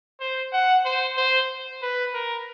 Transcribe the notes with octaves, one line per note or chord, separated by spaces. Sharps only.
C5
F#5
C5
C5
B4
A#4